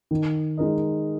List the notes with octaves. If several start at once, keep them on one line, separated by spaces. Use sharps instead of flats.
D#3
G#3 D#4 A#4 D#5